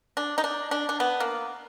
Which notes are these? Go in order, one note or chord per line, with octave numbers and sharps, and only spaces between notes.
D4
D#4
D4
D4
D4
B3
A#3